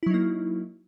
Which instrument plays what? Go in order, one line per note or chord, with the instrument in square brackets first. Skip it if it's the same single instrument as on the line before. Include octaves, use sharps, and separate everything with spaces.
[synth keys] E4
F#3
D#4
A#3